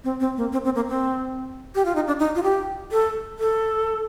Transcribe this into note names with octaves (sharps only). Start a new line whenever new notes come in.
C4
C4
A#3
C4
C4
A#3
C4
G4
F4
D#4
D4
D#4
F4
G4
A4
A4